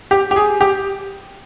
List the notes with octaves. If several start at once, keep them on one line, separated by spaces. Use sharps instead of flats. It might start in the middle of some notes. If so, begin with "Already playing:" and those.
G4
G4
G#4
G4